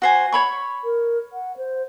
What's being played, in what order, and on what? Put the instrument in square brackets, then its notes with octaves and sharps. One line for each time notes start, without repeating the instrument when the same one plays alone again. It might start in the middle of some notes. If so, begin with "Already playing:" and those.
[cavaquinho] F#4 C5 G#5
C#5 B5 C#6
[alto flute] A#4
F#5
C5